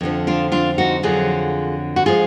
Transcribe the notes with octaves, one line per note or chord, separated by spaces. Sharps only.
F2 D3 F3
D4 F4
D4 F4
D#4 F#4
F2 D3 F#3 F4 G#4
F#4
F3 G#3 F4 G#4